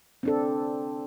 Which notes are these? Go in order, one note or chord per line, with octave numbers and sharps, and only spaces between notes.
C4 D4 A4